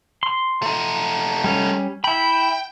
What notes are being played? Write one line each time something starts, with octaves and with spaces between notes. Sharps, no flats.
C6
A3 D#4
G3 C#4
E4 G5 B5